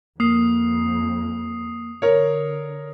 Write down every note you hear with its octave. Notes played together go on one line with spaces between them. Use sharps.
F2 A#3 D#6 C7
D3 A#4 C#5